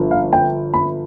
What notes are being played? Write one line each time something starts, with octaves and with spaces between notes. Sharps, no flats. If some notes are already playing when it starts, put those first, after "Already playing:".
Already playing: G1 F3
F5
G5
B5